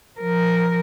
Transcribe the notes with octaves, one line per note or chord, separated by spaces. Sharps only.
F3 A#4